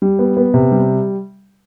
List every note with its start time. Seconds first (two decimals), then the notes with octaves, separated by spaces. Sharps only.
0.02 G3
0.19 B3
0.37 B3
0.54 C3
0.72 G3